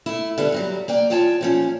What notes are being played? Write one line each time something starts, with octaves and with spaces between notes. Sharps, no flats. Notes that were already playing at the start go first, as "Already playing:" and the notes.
A3 E4
D3 G3 B3 A4
G2 F#3 G3
A#3 D5 G5
E2 F4 C#5 G5 A5
A#2 F3 C#4